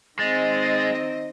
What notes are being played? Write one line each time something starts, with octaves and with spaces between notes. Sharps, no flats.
D#3 G#3 C4 D#5 A6